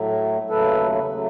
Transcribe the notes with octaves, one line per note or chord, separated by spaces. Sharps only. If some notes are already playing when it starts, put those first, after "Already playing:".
Already playing: A2 F#3 A3
D#2 C#3 F#3 A3 A4 B4
C#3 F#3 A3